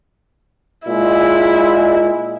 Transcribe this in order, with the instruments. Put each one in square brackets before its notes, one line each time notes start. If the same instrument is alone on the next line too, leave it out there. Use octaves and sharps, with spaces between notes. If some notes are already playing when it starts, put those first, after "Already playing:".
[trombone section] A#2 G#3 [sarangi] E4